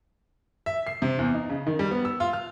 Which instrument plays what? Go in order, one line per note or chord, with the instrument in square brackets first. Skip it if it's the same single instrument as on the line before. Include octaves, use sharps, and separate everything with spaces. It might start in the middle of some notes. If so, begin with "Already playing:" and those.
[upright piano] E5
C7
C3
E2
D#4
C#3
D#3
G3
B3
E6
F4
F6